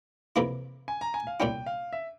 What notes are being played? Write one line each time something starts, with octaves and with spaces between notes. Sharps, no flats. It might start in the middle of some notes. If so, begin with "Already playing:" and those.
F2 C3 E3 A#3 E4
G#5
A#5
G#5
F5
C2 A#2 G3 C#4 E4 G5
F5
E5